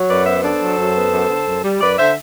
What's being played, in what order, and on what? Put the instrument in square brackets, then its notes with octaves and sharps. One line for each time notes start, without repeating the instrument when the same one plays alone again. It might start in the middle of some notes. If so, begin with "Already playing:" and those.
Already playing: [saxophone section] F#3
F#2 B4 D5
B3 C5 E5
D4 A4 C5
F#3
F#2
B3
F#2
D3
F#2
G3
F#2 B4 D5
D3 C5 E5